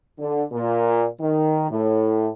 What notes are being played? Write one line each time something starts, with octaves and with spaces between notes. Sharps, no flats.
D3
A#2
D#3
A2